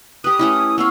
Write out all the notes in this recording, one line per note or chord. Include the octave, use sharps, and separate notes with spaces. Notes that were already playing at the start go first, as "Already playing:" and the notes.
G4 B4 D#6
A3 C#4 E4
B3 F5 C#6 E6